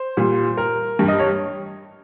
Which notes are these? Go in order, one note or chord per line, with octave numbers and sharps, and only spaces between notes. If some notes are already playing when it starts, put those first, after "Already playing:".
Already playing: C5
A#2 G3
A#4
G2 G3
D#5
C#5